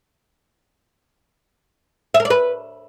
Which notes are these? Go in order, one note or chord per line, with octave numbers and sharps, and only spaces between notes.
E5
A#4
D5
B4